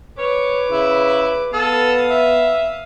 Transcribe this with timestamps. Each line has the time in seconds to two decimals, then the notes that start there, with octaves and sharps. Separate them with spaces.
0.18 B4 C#5 D6
0.71 C#3 E4
1.53 B3 A4 F5 D#6
2.10 E5